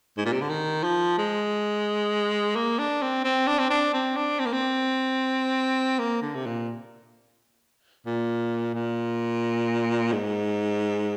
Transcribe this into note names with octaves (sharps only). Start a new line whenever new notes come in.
G#2
A#2
C3
D3
D#3
F3
G#3
A#3
D4
C4
C4
D4
C4
D4
C4
D4
C4
A#3
C4
A#3
D3
C3
A#2
A#2
A#2
G#2